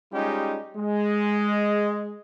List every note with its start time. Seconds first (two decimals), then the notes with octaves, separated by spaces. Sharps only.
0.12 G3 G#3 C#4 D#4 F4 G4
0.76 G#3